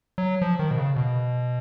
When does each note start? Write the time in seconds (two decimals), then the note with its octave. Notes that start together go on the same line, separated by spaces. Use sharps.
0.18 F#3
0.42 F3
0.59 D#3
0.71 B2
0.78 C#3
0.96 B2